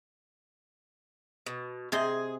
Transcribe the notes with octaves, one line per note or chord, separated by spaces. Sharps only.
B2
C3 G#4 C5 D#5